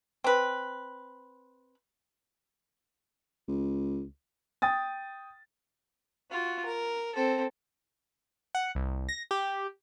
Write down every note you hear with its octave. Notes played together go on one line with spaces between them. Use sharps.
C4 B4
C#2
G5 D#6 A6
F4 F#4
A#4
C4 A4
F#5
C2
A#6
G4